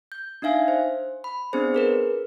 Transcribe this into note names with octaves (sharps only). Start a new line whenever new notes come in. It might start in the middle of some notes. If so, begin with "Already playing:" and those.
G6
D4 D#4 E5 F5 G#5
C5
B5
B3 C4 D4 G#4 C5
G#4 A#4 B4